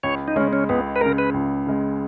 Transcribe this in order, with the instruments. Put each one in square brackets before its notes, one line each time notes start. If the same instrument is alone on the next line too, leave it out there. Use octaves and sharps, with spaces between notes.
[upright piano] C#2 [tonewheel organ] C#5
[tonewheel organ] D#4
[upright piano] C#3 G#3 [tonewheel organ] C#4
[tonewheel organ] C#4
[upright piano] C#2 [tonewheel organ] B3
[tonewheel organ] B4
[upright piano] C#3 G#3 [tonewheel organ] A#4
[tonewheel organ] B4
[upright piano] C#2
C#3 G#3